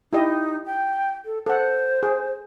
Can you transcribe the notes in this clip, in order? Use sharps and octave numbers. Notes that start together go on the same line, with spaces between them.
D#4 E4 G4 D#5
G5
A4
A4 C5 F#5
G#4